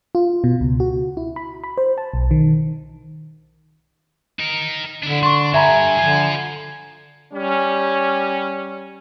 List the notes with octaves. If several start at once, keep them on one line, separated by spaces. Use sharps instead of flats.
F4
B2
C#2
F#4
E4
B5
B5
C5
A5
B1
D#3
D#4 A#4
D3 D4 E4
D4 C6 C#6
G2 G4 E5 G#5 A#5 B5
D3 F4 C5
G3 C#4